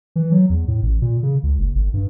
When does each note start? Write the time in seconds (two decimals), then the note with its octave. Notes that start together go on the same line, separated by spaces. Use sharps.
0.16 E3
0.32 F#3
0.50 E2
0.68 A2
0.82 A1
1.02 A#2
1.23 C#3
1.43 C#2
1.59 F#1
1.75 G1
1.94 G2